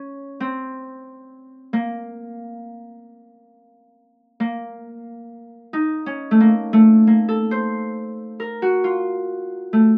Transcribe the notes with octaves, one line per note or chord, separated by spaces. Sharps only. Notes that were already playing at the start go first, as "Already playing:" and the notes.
Already playing: C#4
C4
A#3
A#3
D#4
C#4
A3
A#3
A3
A#3
A4
C5
A#4
F#4
F4
A3